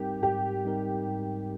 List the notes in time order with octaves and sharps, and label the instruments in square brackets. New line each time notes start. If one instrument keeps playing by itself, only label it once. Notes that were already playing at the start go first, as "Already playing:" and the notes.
Already playing: [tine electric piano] G#2 G3 C4 D#4 A#4 [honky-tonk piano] G4
[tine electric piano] G#2 [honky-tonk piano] G4
[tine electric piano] G3 C4 D#4 A#4
G#2